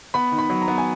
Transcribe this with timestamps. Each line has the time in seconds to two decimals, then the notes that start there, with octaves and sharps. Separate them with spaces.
0.14 B3 B5
0.32 D#3
0.38 B5
0.50 F#3
0.62 A#5
0.68 B3
0.78 G#5